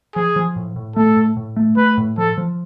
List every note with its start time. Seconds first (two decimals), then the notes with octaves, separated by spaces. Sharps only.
0.15 F3 G#4
0.36 F3
0.56 A2
0.76 A2
0.96 A3 A4
1.16 A2
1.37 A2
1.56 A3
1.77 A3 B4
1.97 A2
2.18 F3 A4
2.38 F3